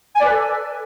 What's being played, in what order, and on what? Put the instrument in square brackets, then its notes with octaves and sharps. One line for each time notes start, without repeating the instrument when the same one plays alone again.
[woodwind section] G#5
D5
B4
A4